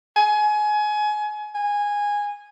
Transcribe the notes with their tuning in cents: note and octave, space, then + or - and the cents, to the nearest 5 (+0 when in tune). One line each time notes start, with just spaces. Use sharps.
G#5 +25
G#5 -15